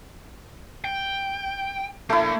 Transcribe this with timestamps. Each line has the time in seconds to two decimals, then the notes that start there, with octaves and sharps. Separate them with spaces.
0.84 G5
2.10 A3 A#3 D4 E4